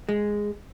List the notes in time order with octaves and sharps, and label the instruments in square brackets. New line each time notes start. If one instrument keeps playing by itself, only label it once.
[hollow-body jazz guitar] G#3